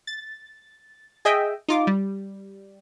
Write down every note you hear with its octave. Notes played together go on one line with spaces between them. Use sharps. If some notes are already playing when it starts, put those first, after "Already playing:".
A6
G#4 D#5 E5 G5
D#4 F4 D6
G3